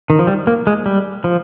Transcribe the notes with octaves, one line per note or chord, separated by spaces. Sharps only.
D#3
F3
G3
A#3
G#3
G3
F3